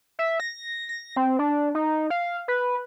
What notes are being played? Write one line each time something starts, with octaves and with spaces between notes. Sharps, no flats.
E5
A#6
A#6
C4
D4
D#4
F5
B4